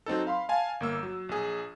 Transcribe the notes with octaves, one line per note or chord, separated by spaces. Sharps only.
F#3 C4 D#4 A4
F5 B5 C6
F5 G#5 A5
G1 A#3 E6
F#3
A#1 G#4